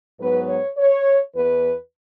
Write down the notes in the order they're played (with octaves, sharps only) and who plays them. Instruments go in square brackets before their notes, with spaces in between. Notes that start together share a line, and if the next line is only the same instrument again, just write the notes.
[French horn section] G#2 F#3 B3 B4
C#5
C#5
E2 E3 B3 B4